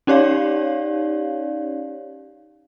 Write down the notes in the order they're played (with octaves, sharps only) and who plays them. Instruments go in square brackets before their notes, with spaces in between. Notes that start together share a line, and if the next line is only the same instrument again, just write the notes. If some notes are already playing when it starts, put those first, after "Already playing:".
[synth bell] C#4 D#4 G4 C#5 D5 F5